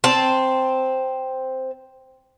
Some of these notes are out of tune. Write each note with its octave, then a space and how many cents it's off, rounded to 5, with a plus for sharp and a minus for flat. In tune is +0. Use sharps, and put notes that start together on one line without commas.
C4 +0 A5 +0